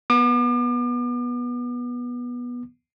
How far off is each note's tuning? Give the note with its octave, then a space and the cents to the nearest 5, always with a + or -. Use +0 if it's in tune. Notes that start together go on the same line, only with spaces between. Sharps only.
B3 -15 D6 +40